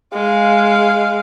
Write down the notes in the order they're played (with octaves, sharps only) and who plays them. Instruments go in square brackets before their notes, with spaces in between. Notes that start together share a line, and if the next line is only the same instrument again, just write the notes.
[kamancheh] G#3 F5